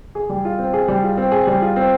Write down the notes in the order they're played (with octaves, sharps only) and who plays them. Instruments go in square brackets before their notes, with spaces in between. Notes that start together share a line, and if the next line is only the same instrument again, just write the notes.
[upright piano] G#4
G3
F4
C4
G#4
G3
F4
C4
G#4
G3
F4
C4